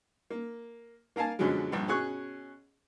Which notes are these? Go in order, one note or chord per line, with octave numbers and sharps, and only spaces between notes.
A#3
A#3 A#4 F5 G#5 A5
F#2 B2 D3 F3 F#3 G#3
A#1 G2
B2 C#4 G#4 C#6 F#6